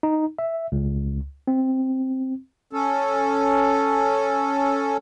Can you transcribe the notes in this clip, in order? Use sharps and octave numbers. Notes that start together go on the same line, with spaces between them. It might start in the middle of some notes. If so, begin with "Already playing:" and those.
D#4
E5
C#2
C4
C#4 A4